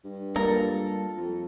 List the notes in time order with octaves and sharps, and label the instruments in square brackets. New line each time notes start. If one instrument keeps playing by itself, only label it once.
[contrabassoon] G2
[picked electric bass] G3 G#3 A#3 [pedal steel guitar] F4 A4 A#5 [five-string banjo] A#4
[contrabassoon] F2